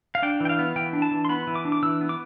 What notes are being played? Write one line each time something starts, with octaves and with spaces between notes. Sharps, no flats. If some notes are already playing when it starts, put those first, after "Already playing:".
F5
D4 G5
E3 G5
F5
B3
E3 G5
D4
A5
E3
C6
B3 B5
E3
D6
D4
D6
E3 E6
B3
D6